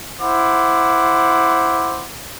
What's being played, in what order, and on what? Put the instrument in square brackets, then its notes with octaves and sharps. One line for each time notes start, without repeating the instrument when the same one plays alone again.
[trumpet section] E4 C5 F#5 D6